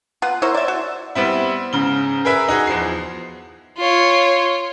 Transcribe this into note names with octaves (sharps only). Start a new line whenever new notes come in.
B3 F4 F#5
E4 A#4 C5 C#5
D5 E5
F#4
G3 B3 C4 E4
G#2 C#3 G7
G#4 A#4 B4 E5
D#4 F#4 G#4
E2 F3 C7
F4 C#5